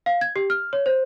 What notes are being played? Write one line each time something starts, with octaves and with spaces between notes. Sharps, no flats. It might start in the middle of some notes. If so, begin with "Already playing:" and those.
F5
G#6
G4
F6
C#5
C5